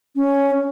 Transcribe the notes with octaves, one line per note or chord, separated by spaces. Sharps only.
C#4